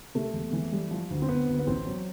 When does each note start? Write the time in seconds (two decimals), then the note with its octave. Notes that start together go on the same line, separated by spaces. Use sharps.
0.15 C3 A3
0.34 E2
0.53 E3
0.72 G3
0.91 F3
1.11 D2
1.22 C4
1.28 D2 B3
1.48 D2
1.59 B3
1.67 A1 C4
1.86 F#3